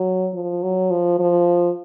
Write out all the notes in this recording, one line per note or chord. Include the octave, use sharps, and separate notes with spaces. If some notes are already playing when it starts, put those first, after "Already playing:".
Already playing: F#3
F3
F#3
F3
F3